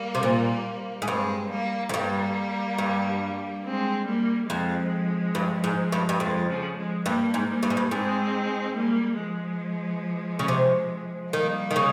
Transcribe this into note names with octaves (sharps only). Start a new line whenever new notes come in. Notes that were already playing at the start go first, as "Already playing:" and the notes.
Already playing: G3 A#3
C3
A#2
G#2
G2 G#3 C4
G3 A#3
F2
G2 G3 A#3
G2
G#3 C4
G3 A#3
F2 F3 G#3
G2
G#2
G2
G2
F2 F3 G#3
C#3 F3
F3 G#3
G2 G3 A#3
G#2
G3 A#3
G2
G#2
G2
G#2 G#3 C4
G3 A#3
F3 G#3
C#3
C3
D#3 G3 A#3
D#3
C#3